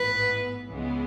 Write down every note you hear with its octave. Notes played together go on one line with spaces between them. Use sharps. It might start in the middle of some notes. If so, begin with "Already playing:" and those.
Already playing: A1 G#2 E3 B3 B4
C#2 C#3 E3 G#3 B3